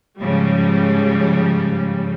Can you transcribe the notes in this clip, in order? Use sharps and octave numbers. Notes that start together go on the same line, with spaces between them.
G#2 C#3 F3 G3